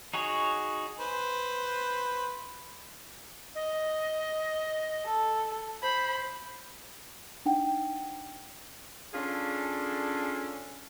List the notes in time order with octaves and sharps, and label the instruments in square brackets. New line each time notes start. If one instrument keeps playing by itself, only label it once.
[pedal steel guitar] D#4 F#4 G#4 C#5
[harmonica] B4 C5
[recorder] D#5
[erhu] A4
[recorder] C5 [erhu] B5
[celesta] D4 D#4 F#5 G5
[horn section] C#4 D4 F4 G#4 A4